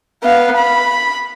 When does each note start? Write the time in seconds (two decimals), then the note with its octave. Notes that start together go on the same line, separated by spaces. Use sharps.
0.23 B3 F5
0.57 B5